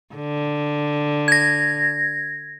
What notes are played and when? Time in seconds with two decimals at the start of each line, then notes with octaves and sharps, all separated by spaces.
0.15 D3
1.28 G#6 A#6